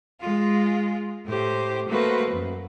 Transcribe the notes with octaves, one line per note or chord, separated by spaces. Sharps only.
G#3 F4
A2 G4 C5
A3 A#3 F#4 B4 C5
F#2